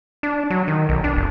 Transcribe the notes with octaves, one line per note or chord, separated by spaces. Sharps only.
D4
F#3
D#3
B1
D4
F1